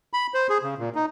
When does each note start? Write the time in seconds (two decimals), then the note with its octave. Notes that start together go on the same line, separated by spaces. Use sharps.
0.13 B5
0.34 C5
0.50 G#4
0.63 C#3
0.78 A#2
0.95 D#4